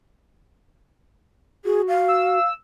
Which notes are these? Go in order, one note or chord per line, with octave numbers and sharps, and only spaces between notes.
F#4 G#4
F5
E6